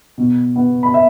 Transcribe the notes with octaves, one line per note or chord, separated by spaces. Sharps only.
B2
B3
B5
E5